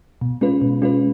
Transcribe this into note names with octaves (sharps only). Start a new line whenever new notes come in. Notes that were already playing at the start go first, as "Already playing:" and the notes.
B2
G#3 C#4 F4 B4
B2
G#3 C#4 F4 B4